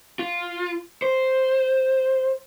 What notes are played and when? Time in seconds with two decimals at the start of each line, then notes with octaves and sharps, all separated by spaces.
0.19 F4
1.02 C5